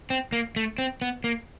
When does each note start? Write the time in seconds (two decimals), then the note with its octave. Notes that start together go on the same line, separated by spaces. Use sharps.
0.10 C4
0.33 A#3
0.56 A3
0.78 C4
1.02 B3
1.24 A#3